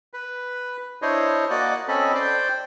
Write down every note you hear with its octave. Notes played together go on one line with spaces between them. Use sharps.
B4
D4 E4 C5 C#5 D#5
A#3 F#4 D5 D#5 F#5
C4 C#4 A4 D#5 B5
C5 D5 G5